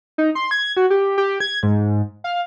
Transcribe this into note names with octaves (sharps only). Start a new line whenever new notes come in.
D#4
C6
G#6
F#4
G4
G4
G#6
G#2
F5